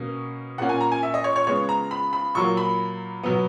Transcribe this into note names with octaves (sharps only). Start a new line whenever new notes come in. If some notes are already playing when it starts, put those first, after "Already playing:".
Already playing: B2 A#3 C#4
A#2 A#3 C#4 F#5
G#5
A#5
G#5
E5
D#5
C#5
C#5
C#3 G#3 B3 C#5
A#5
B5
B5
A#2 F#3 A#3 C#6
B5
B2 F#3 B3